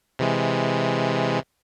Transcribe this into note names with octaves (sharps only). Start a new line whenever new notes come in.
C3 E3 G#3